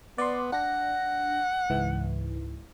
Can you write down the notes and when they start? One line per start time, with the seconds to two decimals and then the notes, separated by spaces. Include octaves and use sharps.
0.18 B3 D5 C6
0.52 D4 F#5 A#6
1.70 C#2 G#2 E3